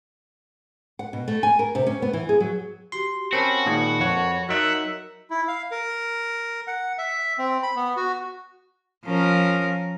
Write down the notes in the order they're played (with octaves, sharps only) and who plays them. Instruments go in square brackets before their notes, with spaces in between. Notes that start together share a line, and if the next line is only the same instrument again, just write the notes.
[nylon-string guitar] F#5
B2
A3
G#5
A#4
C3
C#4
B3
E3
G#4
F#3
[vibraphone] F#4 G4 [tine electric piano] C6
[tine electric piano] C4 C#4 [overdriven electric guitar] F#4 [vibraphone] A#4 A5 B5
[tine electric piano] A#2 D#3 G#3
[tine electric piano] F2 F#5 [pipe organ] C#5
[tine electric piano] F#3 D#4 [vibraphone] A#4 [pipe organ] E5 F#5
[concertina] E4
F5
A#4
F#5
E5
C4
B5
B3
F#4
[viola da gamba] F3 C#4 A#4